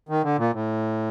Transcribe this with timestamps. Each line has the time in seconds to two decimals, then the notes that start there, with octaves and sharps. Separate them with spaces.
0.09 D#3
0.23 D3
0.38 A#2
0.53 A2